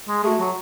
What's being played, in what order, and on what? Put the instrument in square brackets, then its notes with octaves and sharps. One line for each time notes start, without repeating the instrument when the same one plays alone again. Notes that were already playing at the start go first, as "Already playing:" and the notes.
[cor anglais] G#3
[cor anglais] A3 [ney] G#4
[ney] F#4
[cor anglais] F#3